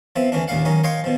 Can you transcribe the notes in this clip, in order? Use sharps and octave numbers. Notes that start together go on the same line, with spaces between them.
F3 B3 C4 E5
D2 E3 C#4 D4
D#2 A#2 C#3 F5 F#5
D#3 F#3 C#4 D#4
C#5 D#5 F5 G5 C6 C#6
B2 F3